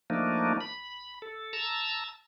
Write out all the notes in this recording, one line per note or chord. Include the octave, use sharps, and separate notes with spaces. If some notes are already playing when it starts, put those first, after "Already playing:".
F3 A3 A#3 D4 D#4
B5
A4
A5 A#5 E6